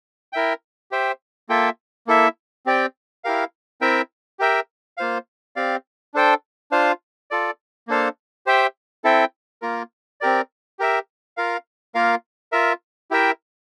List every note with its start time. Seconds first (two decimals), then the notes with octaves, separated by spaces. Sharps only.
0.33 E4 A#4 E5 G5
0.91 G4 C5 E5 G5
1.49 A#3 F4 A4 E5 G5
2.07 A#3 E4 A4 E5
2.66 C4 G4 D5 G5
3.24 E4 G4 A#4 F5
3.81 C4 E4 A#4 E5 G5
4.39 G4 A#4 E5 G5
4.97 A#3 F4 C5 F5
5.56 C4 G4 D5 F5
6.14 D4 A4 C5 G5
6.71 D4 F4 C5 F5
7.31 F4 A4 D5
7.88 A#3 D4 A4 C5 F5
8.46 G4 C5 E5 G5
9.04 C4 E4 A4 E5 G5
9.62 A#3 F4 A#4
10.21 C4 G4 A#4 D5
10.79 G4 A#4 E5
11.37 F4 A#4 F5
11.95 A#3 F4 A#4 F5
12.52 F4 A#4 E5
13.11 E4 G4 A#4 E5 G5